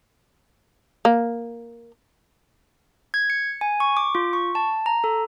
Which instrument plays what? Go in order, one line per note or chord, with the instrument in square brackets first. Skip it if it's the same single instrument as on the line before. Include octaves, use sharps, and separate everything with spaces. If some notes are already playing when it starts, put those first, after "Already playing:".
[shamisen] A#3
[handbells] G#6
C#7
G#5
C#6
D6
F4
C#6
A5
A#5
A4